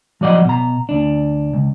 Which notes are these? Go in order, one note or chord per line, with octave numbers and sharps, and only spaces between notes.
F3 F#3 D5 D#5 F#5
B2 A#5
D2 D4
C#2